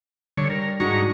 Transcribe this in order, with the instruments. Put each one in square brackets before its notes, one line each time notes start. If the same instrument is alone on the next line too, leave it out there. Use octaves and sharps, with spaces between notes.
[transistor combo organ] D3 C#5 [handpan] G3
[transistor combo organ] A#4
[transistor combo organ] G#2 A#5 C#6 [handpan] D4 D#4 F#4